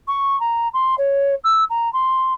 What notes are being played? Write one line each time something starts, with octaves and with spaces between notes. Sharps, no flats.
C#6
A#5
C6
C#5
E6
A#5
C6